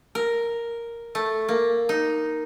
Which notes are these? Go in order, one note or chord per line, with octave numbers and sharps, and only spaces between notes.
A#4
A3
A#3
D#4